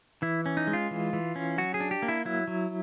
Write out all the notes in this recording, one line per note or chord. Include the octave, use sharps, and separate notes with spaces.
E3 E4
C#4
D#4
G#3
F4
E3
E3
C#4
F#3 F#4
G#4
D4
G4
A#3
E4
F#3 E4
F#3